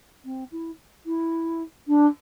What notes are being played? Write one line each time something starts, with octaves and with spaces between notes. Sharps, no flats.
C4
E4
E4
D4